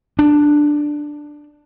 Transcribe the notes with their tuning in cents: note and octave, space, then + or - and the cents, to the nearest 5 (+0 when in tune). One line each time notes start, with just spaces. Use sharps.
D4 +5